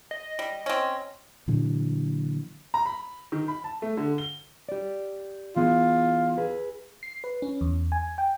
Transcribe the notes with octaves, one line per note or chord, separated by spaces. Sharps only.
D#5
G3
C4 C#4
A#2 D3 E3 F#3
A#5
B5
D#3
B5
A5
A3
D3
G7
G4 D5
E3 B3 F4 G#4
G#4 B4
C7
B4
C#4
E2
G#5
G5